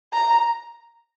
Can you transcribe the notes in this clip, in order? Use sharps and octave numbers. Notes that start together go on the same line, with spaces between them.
A#5